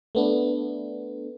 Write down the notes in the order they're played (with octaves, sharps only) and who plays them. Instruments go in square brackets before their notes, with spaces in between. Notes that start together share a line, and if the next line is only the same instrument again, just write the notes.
[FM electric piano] A3 B3 D4